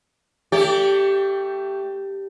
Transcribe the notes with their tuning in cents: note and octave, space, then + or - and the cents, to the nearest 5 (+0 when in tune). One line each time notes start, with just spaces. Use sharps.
A3 +20 G4 +0 D5 -35